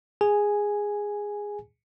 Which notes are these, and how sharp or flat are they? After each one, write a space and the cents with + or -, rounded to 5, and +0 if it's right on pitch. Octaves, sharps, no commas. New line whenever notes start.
G#4 -10 G#5 +0